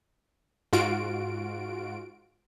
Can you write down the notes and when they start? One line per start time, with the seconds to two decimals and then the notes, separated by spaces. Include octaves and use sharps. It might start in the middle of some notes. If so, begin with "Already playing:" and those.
0.73 G#2 F4 F#4 D7